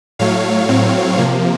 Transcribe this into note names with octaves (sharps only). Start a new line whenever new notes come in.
A2 F#3 A3 C#5 F5
A2 F#3 C4
C3 F3 A#3